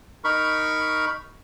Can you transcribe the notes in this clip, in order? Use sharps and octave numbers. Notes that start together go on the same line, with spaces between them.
D#4 A#4 B5 C#6